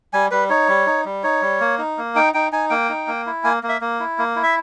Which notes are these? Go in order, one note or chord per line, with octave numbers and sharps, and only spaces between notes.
G3 G#5
G3 B4
D#4 C#5
G3
D#4
G3
D#4 C#5
G3
A#3
D#4
A#3
D#4 G5
D#4 G5
D#4 G#5
A#3 G5
D#4
A#3
E4
A#3 G#5
A#3
E5
A#3
E4
A#3
E4
E5